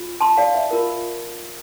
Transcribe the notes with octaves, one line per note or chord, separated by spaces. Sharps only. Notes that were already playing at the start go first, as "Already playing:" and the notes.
Already playing: F4
A5 C6
D5 F5
E5
F4 A#4